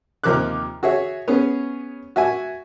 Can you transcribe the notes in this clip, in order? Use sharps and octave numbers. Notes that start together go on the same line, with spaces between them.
D#2 C3 F3 A#4 D6 F#6
F#4 G#4 C#5 E5
B3 C#4 G#4
F#4 E5 G#5